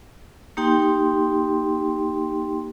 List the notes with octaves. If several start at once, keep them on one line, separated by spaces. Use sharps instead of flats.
A#3 D#4 G4 G5 C6